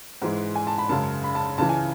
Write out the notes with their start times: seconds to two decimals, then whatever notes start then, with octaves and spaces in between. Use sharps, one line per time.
0.22 G#2 E3 G#3
0.55 G#5
0.67 A5
0.78 B5
0.89 F#2 C#3 G#3 A5
1.24 B5
1.35 A5
1.58 C#2 C#3 E3 A5
1.69 G#5